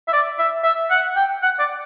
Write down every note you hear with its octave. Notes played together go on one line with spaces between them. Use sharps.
E5
D5
E5
E5
F#5
G5
F#5
D5